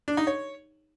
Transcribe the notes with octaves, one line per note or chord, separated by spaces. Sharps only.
D4
D#4
C#5